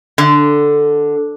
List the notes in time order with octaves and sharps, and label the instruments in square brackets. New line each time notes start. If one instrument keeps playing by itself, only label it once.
[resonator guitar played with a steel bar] D3